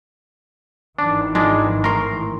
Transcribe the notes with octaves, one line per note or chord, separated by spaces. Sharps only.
G#1 D#3 E3 D4
F3 G#3 D4
A2 A#4 C6